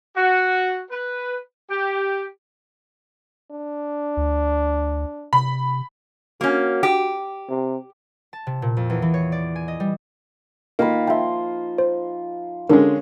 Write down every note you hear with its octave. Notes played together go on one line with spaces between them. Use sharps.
F#4
B4
G4
D4
D2
C3 B5
A#3 C#4 F#4
G4
C3
A5
C3
A#2
F2
E2
E3
C#5
D5
G#5
D#5
G3
D#3 A#3 F4 B5
F3 E5 G5 C6
C5
D3 G#3 C#4 D4 A#4 C#5